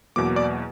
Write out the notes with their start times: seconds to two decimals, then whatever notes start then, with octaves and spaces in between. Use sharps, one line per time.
0.16 E2 B2 F#3 A#3 D6
0.36 D5 D6